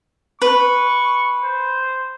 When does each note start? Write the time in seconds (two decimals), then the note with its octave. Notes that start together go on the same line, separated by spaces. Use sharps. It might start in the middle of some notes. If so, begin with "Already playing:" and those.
0.42 B4 C#6
1.44 C5